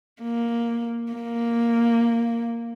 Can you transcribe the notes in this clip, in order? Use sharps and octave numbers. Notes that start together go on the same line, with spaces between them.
A#3
A#3